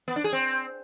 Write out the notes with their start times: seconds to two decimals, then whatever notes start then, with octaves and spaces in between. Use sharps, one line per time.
0.08 B3
0.16 D4
0.24 G#4
0.33 C4